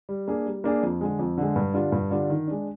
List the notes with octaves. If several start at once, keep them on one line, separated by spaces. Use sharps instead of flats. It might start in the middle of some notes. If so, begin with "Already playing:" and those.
G3
A#3 D4 G#4
G3
A#3 D4 G#4
F2
D3 G#3
F2
D3 G#3
G2
D3 G3 D4 F4
G2
D3 G3 D4 F4
D#3
G#3 D4